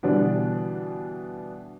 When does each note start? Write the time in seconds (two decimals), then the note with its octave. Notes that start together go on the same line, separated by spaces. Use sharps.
0.03 B2 D3 E3 G3 D4